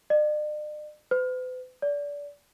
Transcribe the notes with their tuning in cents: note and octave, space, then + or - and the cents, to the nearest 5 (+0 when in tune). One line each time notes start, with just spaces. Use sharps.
D5 +45
B4 +45
D5 -25